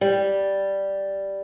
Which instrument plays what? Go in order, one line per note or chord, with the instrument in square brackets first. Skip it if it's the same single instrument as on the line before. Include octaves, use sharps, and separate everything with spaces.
[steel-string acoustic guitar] G3